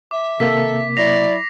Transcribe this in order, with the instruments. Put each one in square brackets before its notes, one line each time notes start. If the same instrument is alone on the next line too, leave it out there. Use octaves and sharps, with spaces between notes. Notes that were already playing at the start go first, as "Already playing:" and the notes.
[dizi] E5 [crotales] D6
[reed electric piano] C3 A#3 [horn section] D#3 A4 [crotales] B6
[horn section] F#3 E4 [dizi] D5 [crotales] A#6 C7 F7